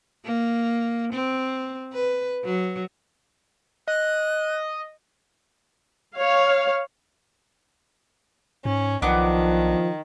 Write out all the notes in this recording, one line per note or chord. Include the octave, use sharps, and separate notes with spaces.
A#3
C4
B4
F#3
D#5 F#6
C#5 F5
G#2 C#4
B1 D#3 F3 B3 D4 D6